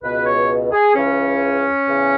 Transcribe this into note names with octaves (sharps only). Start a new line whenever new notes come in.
C#2 B2 B4
C#5
G#4
C#2 C#3 E3 C#4
E2 C#3 E3